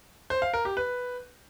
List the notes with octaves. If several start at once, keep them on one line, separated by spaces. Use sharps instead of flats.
C5
F5
A#4
G4
B4